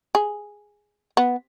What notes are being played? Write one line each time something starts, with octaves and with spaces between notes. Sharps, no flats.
G#4
B3